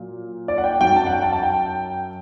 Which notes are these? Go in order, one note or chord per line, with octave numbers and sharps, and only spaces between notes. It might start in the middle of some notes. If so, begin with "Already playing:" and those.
Already playing: A#2 F#3
D5
F#5
G5
F#2 F#3 G5
A5
F#5
G5
A5
A5
G5